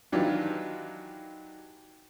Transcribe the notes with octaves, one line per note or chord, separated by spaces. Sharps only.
D#3 E3 F#3 D4 F4 G4